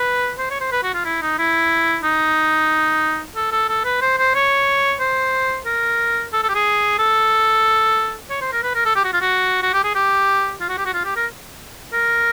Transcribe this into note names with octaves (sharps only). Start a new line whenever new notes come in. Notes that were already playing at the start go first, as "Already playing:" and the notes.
Already playing: B4
C5
C#5
C5
B4
F#4
F4
E4
D#4
E4
D#4
A4
A4
A4
B4
C5
C5
C#5
C5
A#4
A4
A4
G4
G#4
A4
C#5
C5
A#4
B4
A#4
A4
G4
F#4
F4
F#4
F#4
G4
G#4
G4
F4
F#4
G4
F#4
F4
G4
A#4
A#4